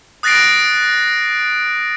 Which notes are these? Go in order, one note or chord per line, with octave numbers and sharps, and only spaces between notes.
D#6 F#6 A6 A#6 C7 D7